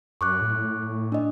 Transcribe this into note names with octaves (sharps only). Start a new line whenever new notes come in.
F#2 C#6 D6 F#6
A2
D4 D#5